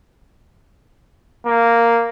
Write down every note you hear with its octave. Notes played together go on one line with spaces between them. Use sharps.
A#3